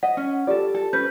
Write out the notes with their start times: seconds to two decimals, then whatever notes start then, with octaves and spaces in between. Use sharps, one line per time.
0.03 D#5 F#5
0.17 C#4
0.47 F4 G4 A4 D5
0.74 A4
0.93 C#4 B4 G6